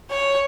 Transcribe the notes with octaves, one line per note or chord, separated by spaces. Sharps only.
C#5